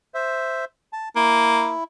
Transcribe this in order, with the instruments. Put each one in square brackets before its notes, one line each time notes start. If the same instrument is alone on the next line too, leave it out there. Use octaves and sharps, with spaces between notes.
[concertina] C5 E5
A5
[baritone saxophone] A#3 [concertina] E4